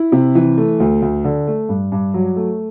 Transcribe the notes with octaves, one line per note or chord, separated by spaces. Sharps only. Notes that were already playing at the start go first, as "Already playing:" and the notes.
Already playing: E4
C3
E3
A3
D2
D2
D3
A3
G2
G2
F#3
A3